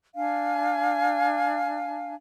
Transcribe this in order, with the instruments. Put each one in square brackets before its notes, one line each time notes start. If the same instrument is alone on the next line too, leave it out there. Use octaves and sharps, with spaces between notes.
[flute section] D4 F5 G#5